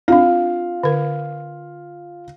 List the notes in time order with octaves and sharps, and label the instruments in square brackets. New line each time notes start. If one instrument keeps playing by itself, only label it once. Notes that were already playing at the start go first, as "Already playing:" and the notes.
[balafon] C4 D4 [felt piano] F4 F5
[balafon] D3 A#4